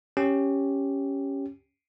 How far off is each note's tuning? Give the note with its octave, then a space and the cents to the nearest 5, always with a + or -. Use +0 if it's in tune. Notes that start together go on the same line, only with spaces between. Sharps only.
C#4 +0 G4 +0